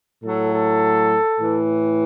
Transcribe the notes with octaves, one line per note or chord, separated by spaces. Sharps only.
A2 F#3 A4
A4
A2 E3